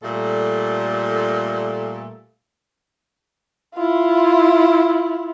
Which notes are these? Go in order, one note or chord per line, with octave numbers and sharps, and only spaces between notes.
A#2 G3 A3 A4
E4 F4